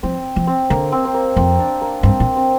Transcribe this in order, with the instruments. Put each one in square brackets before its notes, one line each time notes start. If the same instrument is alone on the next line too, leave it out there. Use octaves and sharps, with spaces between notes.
[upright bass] F3 [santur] C4
[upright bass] F3
[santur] C4
[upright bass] D3 [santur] A#3
[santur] C4
C4
A#3
[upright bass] F2 [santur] C4
[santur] D4
A#3
[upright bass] G2 [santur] C4
[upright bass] A#2
[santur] C4